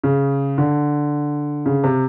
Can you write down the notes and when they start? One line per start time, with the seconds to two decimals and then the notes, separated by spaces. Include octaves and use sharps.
0.04 C#3
0.58 D3
1.66 C#3
1.84 C3